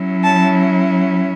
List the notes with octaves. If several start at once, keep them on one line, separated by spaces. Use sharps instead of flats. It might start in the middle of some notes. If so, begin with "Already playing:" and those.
Already playing: F#3 C#4 E4
A5